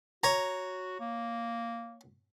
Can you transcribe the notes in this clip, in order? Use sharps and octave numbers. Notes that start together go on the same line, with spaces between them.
F#4 C#5 A#5
A#3